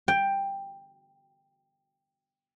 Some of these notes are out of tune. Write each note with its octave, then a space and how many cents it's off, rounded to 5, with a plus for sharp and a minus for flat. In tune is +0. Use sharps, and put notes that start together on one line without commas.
G5 +10